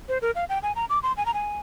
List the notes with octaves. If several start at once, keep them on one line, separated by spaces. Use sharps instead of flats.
C5
A#4
F5
G5
G#5
A#5
D6
C6
G#5
A#5
G#5